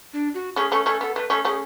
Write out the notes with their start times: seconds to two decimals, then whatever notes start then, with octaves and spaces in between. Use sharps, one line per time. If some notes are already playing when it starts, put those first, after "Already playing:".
0.13 D4
0.34 F#4
0.56 A3 C#4 G#4
0.71 A3 C#4 A4
0.86 A3 C#4 A4
1.01 B3 A4
1.15 A3 B4
1.30 A3 C#4 A4
1.45 A3 C#4 G#4